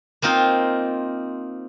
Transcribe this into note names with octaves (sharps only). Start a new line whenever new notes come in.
A#3 C4 D#4 F4